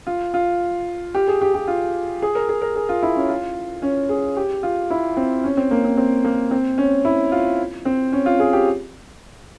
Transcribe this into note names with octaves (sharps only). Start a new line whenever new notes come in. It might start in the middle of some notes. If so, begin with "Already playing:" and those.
F4
F4
G4
G#4
G4
G4
F4
G#4
A#4
G#4
A#4
G#4
F4
E4
C#4
F4
C#4
G#4
G4
F4
E4
C4
C#4
C4
A#3
C4
C4
A#3
C4
C#4
E4
F4
C4
C#4
F4
G#4
G4